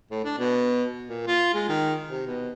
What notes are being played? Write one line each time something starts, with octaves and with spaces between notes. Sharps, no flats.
A2
D4
B2
A#2
F4
G#3
D#3
C3
B2